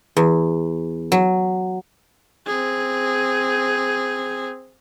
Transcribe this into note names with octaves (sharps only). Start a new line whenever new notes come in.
E2
F#3
C4 G#4